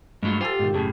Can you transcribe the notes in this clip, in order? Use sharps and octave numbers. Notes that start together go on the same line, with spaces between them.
G2 F#3 G#3 A3 F4
F4 G4 A4 C5 G#5
G#2 B2 D#3
F#2 A2 C#3 G#4 A5